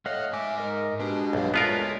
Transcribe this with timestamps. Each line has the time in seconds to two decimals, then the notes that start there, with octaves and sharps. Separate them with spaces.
0.06 A3 C#5 D#5 F5 F#5
0.33 G#2 E5 G#5 D6 E6
0.58 D#4 A#4 D#5
1.00 G#3 D4 F#4 G4 B4
1.33 B1 G2 A#2 F5
1.54 G#3 A3 B3 F4 A#4 C#5 D5 A5